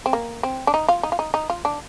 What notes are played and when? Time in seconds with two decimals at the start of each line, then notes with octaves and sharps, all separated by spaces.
0.06 C4
0.13 A#3
0.43 C4
0.67 D4
0.74 D#4
0.89 F4
1.03 D#4
1.12 F4
1.19 D#4
1.34 D#4
1.50 F4
1.65 D4